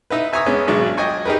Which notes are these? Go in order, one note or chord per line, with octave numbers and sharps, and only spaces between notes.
D#4 E4 B4
E5 G#5 A#5 C#6 D#6 E6
G#3 B3 C#4 D4
G#1 B2 F#3 G#3 D4 C#6
D#5 G5 G#5 C#6
D#4 G4 G#4 A#4 B4